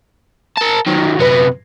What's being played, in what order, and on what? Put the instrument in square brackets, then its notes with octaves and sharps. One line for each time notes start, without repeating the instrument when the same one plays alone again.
[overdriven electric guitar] A#4 A5
D#3 F#3
[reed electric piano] F#2 B4 [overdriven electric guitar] C3 B3